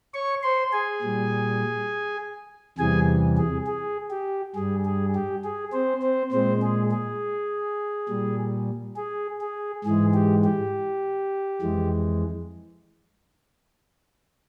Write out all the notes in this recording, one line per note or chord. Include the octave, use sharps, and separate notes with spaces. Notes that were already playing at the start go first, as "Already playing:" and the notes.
C#5 C#6
C5 C6
G#4 G#5
A#2 G3
E2 C3 E3 G3 G#4 G#5
G#4
G#4
G4
G2 G3 G#4
G#4
G4
G#4
C4 C5
C4 C5
A#2 G#3 C4 C5
G#4
G#4
A#2 G3
G#4
G#4
G#2 E3 G#3 G#4
G4
G4
F2 E3 G#3